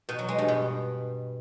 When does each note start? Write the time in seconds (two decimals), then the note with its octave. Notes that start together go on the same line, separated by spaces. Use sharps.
0.09 B2
0.19 F#3
0.28 G#3
0.38 G2
0.48 B2